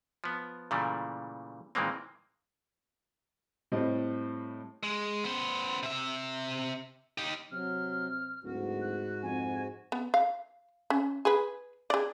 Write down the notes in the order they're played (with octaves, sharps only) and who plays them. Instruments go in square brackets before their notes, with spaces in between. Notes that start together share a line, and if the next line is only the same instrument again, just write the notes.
[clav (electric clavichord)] F3 B3
A#2 C#3 E3 G3 A3
A#2 D#3 E3 G#3 A#3 C4
[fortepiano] A2 G3 C4 D#5
[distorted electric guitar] G#3
B3 C5
C3 E5
D#4 G4
[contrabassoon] C3 [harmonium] F#3 [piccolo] F6
[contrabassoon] D1 [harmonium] G#2 F#4
[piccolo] F#6
[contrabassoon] F2 [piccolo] G#5
[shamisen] B3
F5
C#4
G#4 B4
G#4 D5